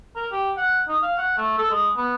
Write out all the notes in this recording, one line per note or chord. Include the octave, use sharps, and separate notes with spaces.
A#4
G4
F#5
D#4
F5
F#5
A3
A4
G#3
B3